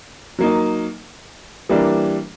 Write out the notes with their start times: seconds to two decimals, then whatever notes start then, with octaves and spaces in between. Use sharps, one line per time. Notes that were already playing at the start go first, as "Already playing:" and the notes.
0.39 F#3 A#3 D#4
1.69 E3 G3 A#3 D4